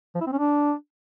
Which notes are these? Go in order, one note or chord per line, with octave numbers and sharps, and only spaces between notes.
F3
E4
C4
C#4
D4